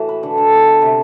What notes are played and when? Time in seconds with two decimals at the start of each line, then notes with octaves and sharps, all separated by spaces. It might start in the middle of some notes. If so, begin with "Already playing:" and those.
Already playing: A2 E3 F#4
0.09 B4
0.23 D3
0.38 D3
0.53 B3
0.67 E5
0.82 C3